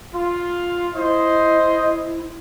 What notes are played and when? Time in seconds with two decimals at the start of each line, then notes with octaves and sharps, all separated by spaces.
0.14 F4
0.95 E4 C5 D#5